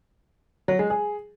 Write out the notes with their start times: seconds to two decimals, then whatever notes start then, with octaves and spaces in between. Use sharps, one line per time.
0.68 F#3
0.79 G#3
0.90 G#4